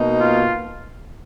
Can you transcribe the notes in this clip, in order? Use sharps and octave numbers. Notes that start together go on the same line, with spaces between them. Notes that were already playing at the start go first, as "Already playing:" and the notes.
Already playing: B2 A#3 D#4
F4